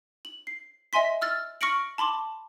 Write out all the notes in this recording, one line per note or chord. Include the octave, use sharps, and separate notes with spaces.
F#7
C7
D#5 E5 G#5 C6 B6
E6 F6 A6
C#6 F6 A#6 C#7 D7 F#7
A5 B5 C6 D6